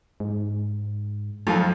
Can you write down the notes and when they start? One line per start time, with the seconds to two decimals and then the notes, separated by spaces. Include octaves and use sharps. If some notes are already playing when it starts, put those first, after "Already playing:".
0.20 G#2
1.47 F2 F#3 F4 A4